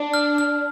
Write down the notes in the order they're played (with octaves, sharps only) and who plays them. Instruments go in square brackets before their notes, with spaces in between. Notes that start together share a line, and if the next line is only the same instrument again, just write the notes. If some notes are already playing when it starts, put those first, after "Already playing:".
Already playing: [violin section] D4
[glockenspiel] F6
F6